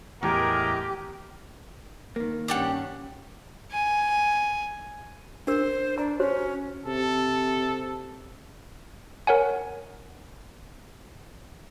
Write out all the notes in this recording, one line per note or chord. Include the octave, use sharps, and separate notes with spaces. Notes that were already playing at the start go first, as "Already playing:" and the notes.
E2 A2 G#3 G4 G#4 A#4
D#3 A#3
G2 C#4 D4 G4 F#5
G#5
D4 A#4 C5
D4 A#5
C#4 F#4 C5 C#5
C3 A4
A#4 C#5 F#5 G#5